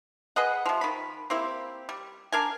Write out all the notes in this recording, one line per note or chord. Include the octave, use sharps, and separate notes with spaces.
G#4 B4 D#5 F#5
C3 F3
D#3 B5
A#3 C4 E4 G4
G3
D4 A#4 G#5